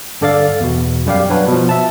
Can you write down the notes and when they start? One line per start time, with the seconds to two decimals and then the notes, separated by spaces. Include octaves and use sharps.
0.21 G2 D3 A4 D5 F5 A6
0.60 E2 B2
1.06 F#2 G3 G4 F5
1.30 F#3 D4 F#4 B4
1.48 B2 F3
1.69 E5 A5